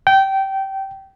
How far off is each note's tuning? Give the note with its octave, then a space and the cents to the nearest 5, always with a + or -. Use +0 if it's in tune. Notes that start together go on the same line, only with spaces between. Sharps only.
G5 -20